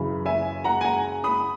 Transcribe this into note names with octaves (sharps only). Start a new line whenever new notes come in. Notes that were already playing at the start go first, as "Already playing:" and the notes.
Already playing: F#2 C#3 E3 B5
E5 G#5
F#5 A#5
G#5
F#5 A#5
B5 D#6